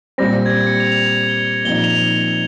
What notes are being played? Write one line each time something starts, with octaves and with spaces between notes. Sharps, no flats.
A#2 G3 C4 A#6
G#6
A#6
C#7
F7
F7
G7
A#2 F3 C4 D#4 G7
F7